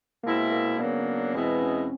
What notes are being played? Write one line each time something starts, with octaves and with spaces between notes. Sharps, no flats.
B2 G#3 A#3 C4 E4
A#3
C#3 F#3 A#3 B3 D4
E2 B2 G#3 B3 C4 E4
C#4